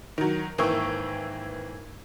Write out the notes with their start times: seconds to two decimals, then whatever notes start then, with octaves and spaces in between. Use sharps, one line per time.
0.18 D#3 F#3
0.58 G#1 E3 A#3 G5 C#6 E6